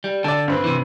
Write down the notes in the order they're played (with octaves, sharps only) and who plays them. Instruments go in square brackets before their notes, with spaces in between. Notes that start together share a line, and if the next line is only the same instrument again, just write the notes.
[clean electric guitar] G3
[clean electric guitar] D3 [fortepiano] D5 A5
[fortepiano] G2 C4 B4
[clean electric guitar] C3 E3